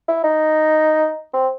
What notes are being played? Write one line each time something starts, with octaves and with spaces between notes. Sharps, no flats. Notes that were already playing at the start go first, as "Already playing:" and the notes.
E4
D#4
C4